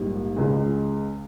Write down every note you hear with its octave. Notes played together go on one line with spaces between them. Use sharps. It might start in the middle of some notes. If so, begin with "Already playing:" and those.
Already playing: A#1 G#2 G3 A#3
C#2 C#3 G#3